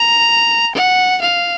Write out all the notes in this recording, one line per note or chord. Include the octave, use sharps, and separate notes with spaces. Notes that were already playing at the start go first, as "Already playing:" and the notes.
Already playing: A#5
F#5
F5